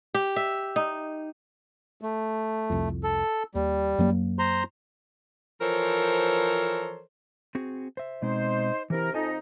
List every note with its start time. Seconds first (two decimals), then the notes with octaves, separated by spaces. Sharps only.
0.14 G4
0.36 E5
0.76 D#4
2.01 A3
2.70 C2 F2
3.03 A4
3.55 D#2 G3
3.98 F#2 F#3 A#3
4.39 C5 A#5 C6
5.61 E3 F3 A4 A#4 C5 C#5
7.55 C4 F#4 G#4
7.97 C5 E5
8.22 B2 G#3 C4 D#4 C5
8.90 C3 E3 E4 A#4
9.14 F2 D#4 D#5 G#5 A5